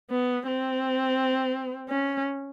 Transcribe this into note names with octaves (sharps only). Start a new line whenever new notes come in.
B3
C4
C#4